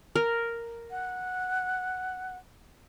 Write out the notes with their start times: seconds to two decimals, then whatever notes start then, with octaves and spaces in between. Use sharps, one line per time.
0.16 A#4
0.91 F#5